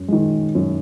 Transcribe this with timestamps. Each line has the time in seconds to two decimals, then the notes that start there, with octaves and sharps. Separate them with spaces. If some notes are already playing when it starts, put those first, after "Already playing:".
Already playing: F#2
0.08 D#3 G#3
0.55 F#2